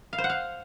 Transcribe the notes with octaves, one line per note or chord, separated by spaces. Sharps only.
F5
C5
F#5
F5